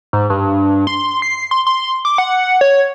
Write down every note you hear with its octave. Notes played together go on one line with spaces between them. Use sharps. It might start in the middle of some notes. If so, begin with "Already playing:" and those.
G#2
G2
C6
C7
C6
C6
D6
F#5
C#5